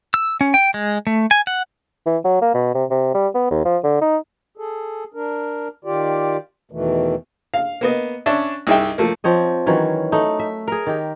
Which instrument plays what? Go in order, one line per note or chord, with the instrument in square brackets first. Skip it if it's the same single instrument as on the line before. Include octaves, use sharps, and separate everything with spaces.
[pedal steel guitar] E6
C#4
G5
G#3
A3
G#5
F#5
[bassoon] E3
F#3
A#3
B2
C3
C3
G3
B3
D#2
F3
D3
D#4
[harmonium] G#4 A4
D4 A#4
D#3 F4 G4 D5
E2 B2 D#3 E3 A3
[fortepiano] F5
A#3 B3 D#5
C#4 D4 E5
C2 D#4 G#4 E5 G5
F3 A3 A#3
[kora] F3 C4 C#5 D#5
D#3 E3 F#3 C#4
A3 D#4
E5
G#4 A#4
D#3 G4